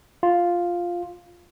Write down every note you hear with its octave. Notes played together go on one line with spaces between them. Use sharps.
F4